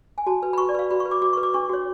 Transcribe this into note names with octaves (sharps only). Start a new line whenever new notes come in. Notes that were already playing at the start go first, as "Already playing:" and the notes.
G#5
F#4 A5
B4
B5
F#4 C#6
D5
B4 F5
F#4 B5
C#6
B4
D6
F#4 D6
B4 C#6
D6
D4 C#6
F#4 C#5